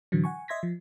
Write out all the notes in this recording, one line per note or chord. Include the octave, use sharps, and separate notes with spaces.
A2 D3 E3 F#3
F#5 G#5 C#6
D#5 E5 C6 G#6 A#6 B6
F3